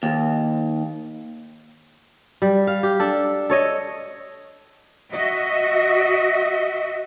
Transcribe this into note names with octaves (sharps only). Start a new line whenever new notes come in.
D#2
G3
F5
G4
D4 A4
A4 C#5 D#5
F#4 D#5 E5